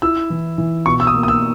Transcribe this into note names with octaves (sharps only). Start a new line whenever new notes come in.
E4 E6
E3
E3
B2 C#6
E6
D#6
A#3
D#6
E6